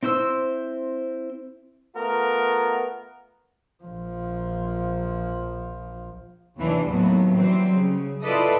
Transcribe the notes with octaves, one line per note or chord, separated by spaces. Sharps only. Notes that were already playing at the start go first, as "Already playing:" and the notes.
C4 E4 C5 C6 E6
A3 B3 F4 A#4
A#1 F3
D#2 C3 E3 D4
D#2 A2 F#3 A3 B3
E3 F#3 G3 C4
C#3
E4 F4 A4 B4 D5 D#5